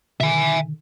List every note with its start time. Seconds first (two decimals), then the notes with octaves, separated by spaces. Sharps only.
0.20 B2 D3 D#3 E5 G#5